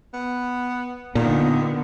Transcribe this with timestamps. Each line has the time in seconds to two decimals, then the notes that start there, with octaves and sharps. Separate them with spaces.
0.14 B3
1.15 A#2 D3 D#3 B3